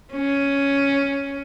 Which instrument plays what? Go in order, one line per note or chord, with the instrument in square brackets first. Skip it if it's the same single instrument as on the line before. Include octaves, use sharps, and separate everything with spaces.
[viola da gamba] C#4